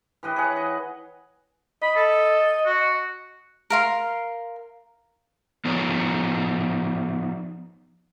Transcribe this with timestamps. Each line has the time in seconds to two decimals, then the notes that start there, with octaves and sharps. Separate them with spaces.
0.23 E3 G4 B4 D#5
0.36 G#4 C#5 F#5
0.57 D#5
1.82 D#5 B5
1.96 A4
2.66 F#4
3.70 A#4 F5 C6
5.65 F3 B3 D#4 C#5